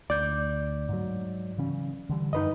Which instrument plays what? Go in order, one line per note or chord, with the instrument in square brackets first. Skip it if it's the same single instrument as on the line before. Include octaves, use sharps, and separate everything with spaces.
[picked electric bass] D2 [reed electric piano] D5 G6
[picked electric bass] G#2 F#3
C#3 E3 C#4
D3 E3 G3
[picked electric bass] F#2 D#3 [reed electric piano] D#4 B4 D#5